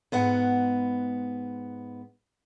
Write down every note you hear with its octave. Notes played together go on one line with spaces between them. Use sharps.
G#2 B3 F#5